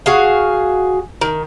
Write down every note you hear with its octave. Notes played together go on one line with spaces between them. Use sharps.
F#4 G#4 F5
D#3